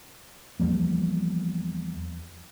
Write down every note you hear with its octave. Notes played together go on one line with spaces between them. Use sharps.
E2 F3 G3 A#3